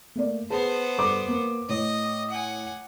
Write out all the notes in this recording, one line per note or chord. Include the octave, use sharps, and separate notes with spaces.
A3 A#3 D5
B3 G#4 B4 C5 A5
G2 A4 D6
A#3
A2 C#5 D#5
F#5 G#5